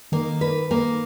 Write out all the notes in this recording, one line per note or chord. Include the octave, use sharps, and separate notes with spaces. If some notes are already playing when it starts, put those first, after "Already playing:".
D#3 A#3
B4
A#3